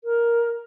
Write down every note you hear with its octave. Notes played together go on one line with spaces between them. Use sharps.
A#4